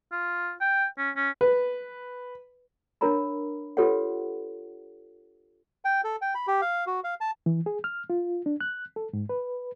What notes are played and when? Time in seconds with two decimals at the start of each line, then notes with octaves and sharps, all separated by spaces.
0.12 F4
0.61 G5
0.98 C#4
1.16 C#4
1.41 B4
3.01 D4 A#4 C#5 A#5 B5
3.77 F4 G4 A4 B4 C#5 F#5
5.85 G5
6.04 A4
6.22 G5
6.35 B5
6.47 G4
6.61 F5
6.87 F#4
7.04 F5
7.21 A5
7.46 E3
7.66 G#4
7.84 F6
8.10 F4
8.46 D4
8.61 F#6
8.96 A4
9.13 G#2
9.29 B4